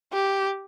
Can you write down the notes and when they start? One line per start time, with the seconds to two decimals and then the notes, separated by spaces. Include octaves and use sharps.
0.13 G4